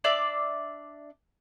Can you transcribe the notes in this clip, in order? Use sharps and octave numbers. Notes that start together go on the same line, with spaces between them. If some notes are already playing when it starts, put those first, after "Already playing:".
D4 D5 E5 D6